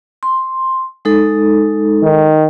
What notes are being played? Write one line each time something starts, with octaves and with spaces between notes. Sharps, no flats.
C6
G#3 D#4 A4
D#3